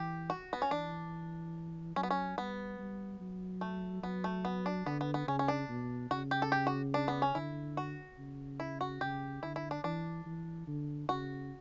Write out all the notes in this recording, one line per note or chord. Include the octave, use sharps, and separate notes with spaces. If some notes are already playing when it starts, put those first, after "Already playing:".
Already playing: E3 G4
F#4
B3
C#4
E3 D4
F#3 C#4
B3
C#4
G3 B3
G3
F#3
A3
F#3 B3
A3
B3
D4
D3 B3
B3
B3
C#3 C#4
C#4
D4
B2
C#3 F#4
G4
A4
G4
F#4
D4
B3
C#4
D3 E4
F#4
C#3
E4
F#4
C#3 G4
D3 E4
E4
D4
E3 D4
E3
D3
C#3 F#4